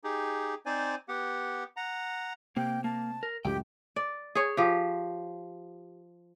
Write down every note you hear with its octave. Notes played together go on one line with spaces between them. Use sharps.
D#4 G4 G#4
C4 D#4 C5 D5 G#5
B3 G4 F#5
F#5 A#5
C3 A#3 G5
A#3 A5
A#4
C#2 F#2 A2 G4 G5
D5
G#4 C#5
F3 G4